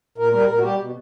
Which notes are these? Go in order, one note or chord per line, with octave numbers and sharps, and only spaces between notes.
A#2 A#4
G3 A#4
A#2 A#4
F#4
G3 G4
B2